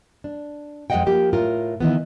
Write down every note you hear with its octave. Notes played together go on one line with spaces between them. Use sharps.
D4
F2 G#3 A#4 D#5 F#5 G5
F3 A#3 G4
A2 F4 A#4
D#3 E3 B3